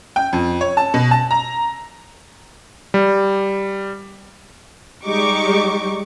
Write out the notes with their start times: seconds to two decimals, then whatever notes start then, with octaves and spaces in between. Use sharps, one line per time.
0.16 G5
0.33 F2
0.61 C#5
0.77 A5
0.94 B2
1.11 A5
1.31 A#5
2.94 G3
5.05 G3 G#3 D#4 G4 C#6 D6